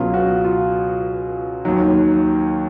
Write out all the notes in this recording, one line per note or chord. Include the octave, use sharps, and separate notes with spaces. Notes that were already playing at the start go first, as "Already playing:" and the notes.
Already playing: C#2 B2 F#3 F4
F#4
F4
D#2 D#3 F#3